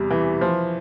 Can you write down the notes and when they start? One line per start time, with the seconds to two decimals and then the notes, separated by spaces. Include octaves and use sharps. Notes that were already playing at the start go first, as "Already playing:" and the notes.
Already playing: E2 C3 G3
0.10 E3
0.41 F3